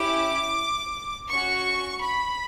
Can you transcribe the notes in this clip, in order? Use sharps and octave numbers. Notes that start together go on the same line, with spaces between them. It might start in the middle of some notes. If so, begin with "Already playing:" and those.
Already playing: C#4 E4 G4 D6
C#4 F#4 C#6
B5